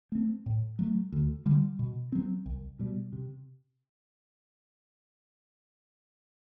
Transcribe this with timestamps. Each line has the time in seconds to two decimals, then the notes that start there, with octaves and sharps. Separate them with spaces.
0.12 A3 C4
0.46 A2
0.79 F#3 A3
1.12 D2
1.46 D3 G3
1.79 B2
2.12 F#3 C4
2.46 C2
2.79 B2 G3
3.13 C3